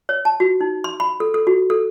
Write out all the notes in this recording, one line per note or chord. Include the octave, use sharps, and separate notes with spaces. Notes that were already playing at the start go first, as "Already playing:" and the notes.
C#5
A5
F#4
D#4
C6
B5
A4
A4
F#4
A4